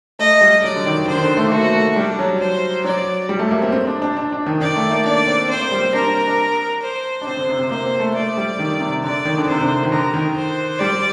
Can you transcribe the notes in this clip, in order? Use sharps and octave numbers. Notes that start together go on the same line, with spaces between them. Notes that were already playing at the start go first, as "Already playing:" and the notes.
A3 D#5
G3
F#3 D5
D3
D#3
D3 C5
D#3
D3
A3
A#3
A3 F#4
A3
G3 D4
F#3
C5
F#3 D5
G3
A3
A#3
C4
C4
D4
D4
D4
D4
D#3
D#3 D5
A3
A#3
D4 D5
C4
C4 C5
A#3
G3
C4
D4 A#4
C4
D4
C5
D4
C4 C5
D3
C3
C3
A#3 C5
C4
A3
A3 D5
G3
D#3
C3
D3 D5
D#3
D3
C3 C5
D3
D#3
D3 A#4
D#3
C5
G3 D5